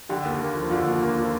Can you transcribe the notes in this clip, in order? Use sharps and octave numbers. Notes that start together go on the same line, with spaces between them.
D3 G4
D#2
A#3
F3
D3 F4
D#2
A#3
F3